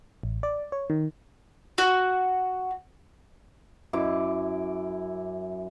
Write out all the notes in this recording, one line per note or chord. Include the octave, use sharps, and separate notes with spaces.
A1
D5
C#5
D#3
F#4
F#2 E4 D6